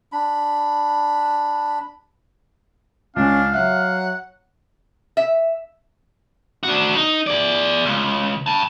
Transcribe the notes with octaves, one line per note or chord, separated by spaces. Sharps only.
D4 B5
C#2 C#4 D4 F5
F#3 E5 F#5
E5
D4 F#4
D#4
G#4 D5
C#2
G5 A5